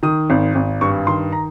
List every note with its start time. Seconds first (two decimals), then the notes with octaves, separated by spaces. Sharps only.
0.03 D#3 D#6
0.30 G#1
0.55 G#1
0.81 G2 C#6
1.07 D#3 C6
1.32 A#5